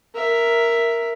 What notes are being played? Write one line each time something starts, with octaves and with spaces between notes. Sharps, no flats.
A#4 E5